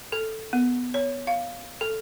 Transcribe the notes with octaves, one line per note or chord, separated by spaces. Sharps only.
A4
B3
C#5
F5
A4